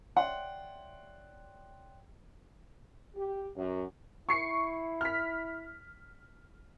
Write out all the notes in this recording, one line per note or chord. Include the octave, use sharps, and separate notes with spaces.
C#5 D5 E5 F#5 G5 C6
G4
F#2
E4 C#6 C7 C#7
F6 B6